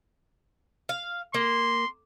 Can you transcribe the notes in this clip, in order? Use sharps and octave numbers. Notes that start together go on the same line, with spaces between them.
F5
A#3 C6